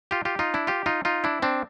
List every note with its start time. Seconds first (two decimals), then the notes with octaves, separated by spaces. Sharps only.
0.11 F4 G4
0.25 F4 G4
0.39 D#4 F4
0.54 D4 E4
0.67 F4 G4
0.86 D#4 F4
1.05 D#4 F4
1.24 D4 E4
1.42 C4 D4